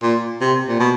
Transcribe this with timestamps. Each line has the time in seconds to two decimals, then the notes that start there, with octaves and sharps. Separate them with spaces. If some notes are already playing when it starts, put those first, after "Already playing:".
0.02 A#2
0.41 C3
0.68 A#2
0.80 B2